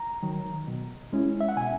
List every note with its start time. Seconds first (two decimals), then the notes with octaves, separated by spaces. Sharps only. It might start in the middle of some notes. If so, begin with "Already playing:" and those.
Already playing: A#5
0.23 D#3 F#3
0.67 B2
1.13 G#3 C#4 E4
1.41 E5
1.49 F#5
1.56 B2 G#5